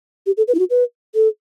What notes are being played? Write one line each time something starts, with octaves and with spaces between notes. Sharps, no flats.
G4
A4
B4
E4
F#4
B4
A4